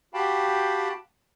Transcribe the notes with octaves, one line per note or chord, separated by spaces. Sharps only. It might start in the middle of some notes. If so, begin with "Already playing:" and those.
F#4 G4 F5 G5 A5 B5